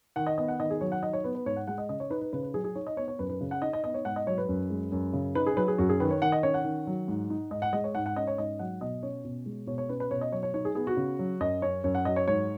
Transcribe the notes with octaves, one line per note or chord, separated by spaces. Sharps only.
D#3 F#5
D#5
B3 D#5
F#5
D#3 D#5
G#4
F#3 C#5
F#5
D#4 D#5
C#5
B3 B4
B4
G#2 C#5
F#5
G#3 F#5
D#5
C#3 D#5
C#5
D#4 B4
B4
C#3 B4
B4
F#3 G#4
G#4
D#4 C#5
D#5
B3 C#5
C#5
F#2 B4
B4
C#3
F#5
D#4 D#5
D#5
B3 D#5
C#5
G#2 F#5
D#5
F#3 C#5
B4
F#2
G#3
F#2
C#3
D#4 B4
G#4
F#3 B4
G#4
F#2 F#4
G#4
D#3 B4
C#5
D#3 F#5
D#5
C#4 C#5
F#5
D#3
F#3
G#2
D#4
G#2 D#5
F#5
G#3 D#5
C#5
G#2 F#5
F#5
C#4 D#5
C#5
G#2 D#5
F#3 F#5
B2 D#5
C#4 C#5
B2
G#3
B2 C#5
C#5
C#4 B4
B4
B2 C#5
D#5
F#3 C#5
C#5
D#4 C#5
G#4
B3 G#4
F#4
C#3
F#3
F#2 D#5
C#4 C#5
F#2 C#5
F#5
F#3 D#5
C#5
G#2 C#5